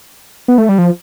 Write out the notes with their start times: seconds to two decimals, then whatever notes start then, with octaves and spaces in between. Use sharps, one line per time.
0.48 B3
0.58 A3
0.69 G3
0.78 F3